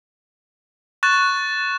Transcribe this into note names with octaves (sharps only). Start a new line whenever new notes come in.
C#6 F#6 A6 E7